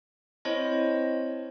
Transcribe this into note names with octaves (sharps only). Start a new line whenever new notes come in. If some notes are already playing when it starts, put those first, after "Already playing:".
C4 E4 C5 C#5 D#5 A5